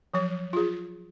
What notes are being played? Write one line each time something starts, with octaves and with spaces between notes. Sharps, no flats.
F3 F#3 C#5
F4 G#4